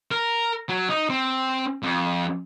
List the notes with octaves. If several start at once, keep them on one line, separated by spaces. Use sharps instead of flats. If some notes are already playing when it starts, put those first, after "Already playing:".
A#4
F#3
D#4
C4
F2